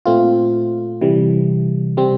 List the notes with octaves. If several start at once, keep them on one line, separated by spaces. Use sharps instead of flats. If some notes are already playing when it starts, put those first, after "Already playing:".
A#2 A3 C4 F4
C3 E3 G3
C3 G3 C4